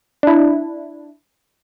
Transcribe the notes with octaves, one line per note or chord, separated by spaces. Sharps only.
D4 E4